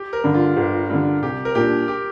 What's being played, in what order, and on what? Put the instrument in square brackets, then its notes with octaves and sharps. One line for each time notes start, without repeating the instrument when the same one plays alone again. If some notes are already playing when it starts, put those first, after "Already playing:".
Already playing: [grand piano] G4
A#4
[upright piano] G2 D3
[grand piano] F4
[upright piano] G1
G2 D3
[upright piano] C2 [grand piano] G4
[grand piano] A#4
[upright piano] A#2 G3 D4 [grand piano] G4
[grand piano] G4